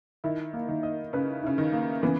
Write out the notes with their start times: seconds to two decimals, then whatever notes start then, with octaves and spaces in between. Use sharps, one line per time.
0.24 D#3 E4
0.53 A#3
0.69 D#3
0.83 D#5
1.13 C#3 B4
1.43 C#3 E4
1.58 D#3
1.72 A#3
2.02 C#3 E3 B3